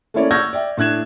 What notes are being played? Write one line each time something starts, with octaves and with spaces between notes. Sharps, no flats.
A3 A#3 C#4 E4 C#5 D5
C#6 E6 F6 G6 G#6 A#6
D5 E5 G5
A2 D4 F#6 G#6 E7